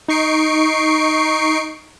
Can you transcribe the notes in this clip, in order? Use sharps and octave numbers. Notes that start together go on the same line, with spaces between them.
D#4 C#6 C7 D7